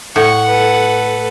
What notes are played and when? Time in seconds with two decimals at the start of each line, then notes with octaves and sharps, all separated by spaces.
0.16 A2 F#5 C#6
0.48 A4 B4